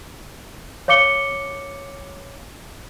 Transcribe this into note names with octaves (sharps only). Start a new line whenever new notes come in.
C#5 F5 D6 C#7 G7